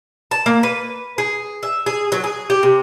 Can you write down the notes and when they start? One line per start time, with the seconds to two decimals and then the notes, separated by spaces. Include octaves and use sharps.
0.31 A5
0.46 A#3
0.63 B4
1.18 G#4
1.63 E5
1.86 G#4
2.12 F#3
2.24 G#4
2.50 G4
2.63 C3